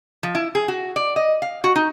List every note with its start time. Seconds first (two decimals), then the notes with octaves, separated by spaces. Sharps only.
0.23 F3
0.35 E4
0.55 G#4
0.68 F#4
0.96 D5
1.16 D#5
1.42 F5
1.64 F#4
1.76 D#4